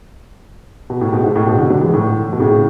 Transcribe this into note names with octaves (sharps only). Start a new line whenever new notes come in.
B2
A2
G#2 B2
G#2
A2
G#2 B2
B2 D3
D3 F#3
E3 G#3
A2
B2
A2 C#3